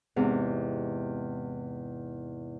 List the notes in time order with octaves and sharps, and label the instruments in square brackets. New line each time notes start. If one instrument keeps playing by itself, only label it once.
[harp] E2 G#2 C3